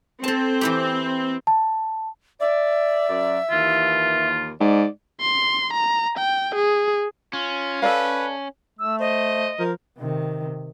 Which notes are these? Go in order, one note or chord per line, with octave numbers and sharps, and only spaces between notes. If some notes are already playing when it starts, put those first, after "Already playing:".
C4 A4 A5
E3 E4 G4
A5
D5 E5
F#2 D5
D#2 E3 F4
G#2 D5
C6
A#5
G5
G#4
C#4 F4
A4 B4 D5 F5
A3 E6
C5 D#5
F3 A#4
C3 D#3